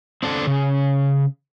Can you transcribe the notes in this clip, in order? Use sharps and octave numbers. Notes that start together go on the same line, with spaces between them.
C4 D4 A4
C#3